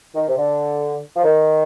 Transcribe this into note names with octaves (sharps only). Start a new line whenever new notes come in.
D#3
C3
D3
F3
D#3